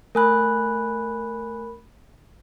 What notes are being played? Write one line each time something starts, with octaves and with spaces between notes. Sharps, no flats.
A3 A#4 G#5 B5 F#6